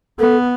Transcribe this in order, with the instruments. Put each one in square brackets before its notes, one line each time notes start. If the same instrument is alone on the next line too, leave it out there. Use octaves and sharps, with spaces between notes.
[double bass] B3 [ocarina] A4